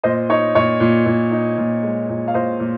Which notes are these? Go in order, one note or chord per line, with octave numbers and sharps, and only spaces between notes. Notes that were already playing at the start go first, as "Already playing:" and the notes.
A#2 C5 D#5
D#4 C#5
A#2 C#5
A#2
A#2
D#4
A#2
G#3
A#2
F5
A#2 C5 D#5
A#2